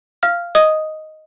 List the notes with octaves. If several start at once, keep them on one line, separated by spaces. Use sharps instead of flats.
F5 F6
D#5 D#6